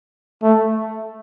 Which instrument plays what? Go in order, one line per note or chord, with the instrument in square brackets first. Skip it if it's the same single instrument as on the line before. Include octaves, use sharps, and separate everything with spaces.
[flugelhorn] A3